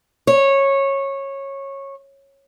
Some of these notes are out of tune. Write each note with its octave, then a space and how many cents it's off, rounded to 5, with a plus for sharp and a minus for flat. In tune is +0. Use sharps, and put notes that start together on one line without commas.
C#5 -15